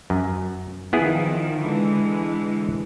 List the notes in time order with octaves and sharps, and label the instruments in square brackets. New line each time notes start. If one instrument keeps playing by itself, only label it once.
[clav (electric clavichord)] F#2
[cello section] D#3 F3 [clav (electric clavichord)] B3 E4 G#4
[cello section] D3 E3 G#3